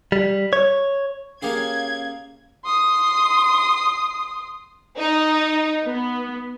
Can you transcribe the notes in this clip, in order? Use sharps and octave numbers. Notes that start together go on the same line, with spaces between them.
G3
C#5
A#3 C#4 G4 G#4 F5 G#6
C6 D#6
D#4
B3